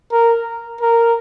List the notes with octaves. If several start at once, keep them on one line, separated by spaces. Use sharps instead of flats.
A#4
A#4